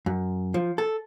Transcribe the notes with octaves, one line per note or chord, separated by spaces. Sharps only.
F#2
F3
A4